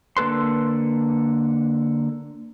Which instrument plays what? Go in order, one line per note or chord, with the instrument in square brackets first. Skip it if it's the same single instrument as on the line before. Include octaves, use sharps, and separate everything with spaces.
[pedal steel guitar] D3 A#3 A4 B4 C6